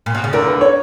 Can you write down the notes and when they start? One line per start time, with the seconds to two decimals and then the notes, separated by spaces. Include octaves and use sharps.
0.06 A#2
0.15 B2
0.24 C#3
0.33 D2 D3 A#4
0.47 B4
0.61 C#5